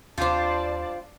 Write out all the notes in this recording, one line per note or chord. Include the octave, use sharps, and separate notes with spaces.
D#2 G3 C4 D4 F4 C5 D5 A5